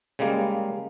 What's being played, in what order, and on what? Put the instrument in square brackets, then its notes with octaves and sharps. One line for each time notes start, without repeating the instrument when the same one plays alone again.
[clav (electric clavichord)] C#3 G3 G#3 A#3